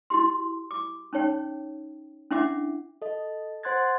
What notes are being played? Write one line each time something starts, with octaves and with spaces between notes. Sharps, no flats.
E4 F#4 G4 C6
D6
C#4 D#4 C#5 G5
C#4 D4 E4 E5 F#5 D6
A4 D#5
C5 F#5 C6 F#6 G#6 A6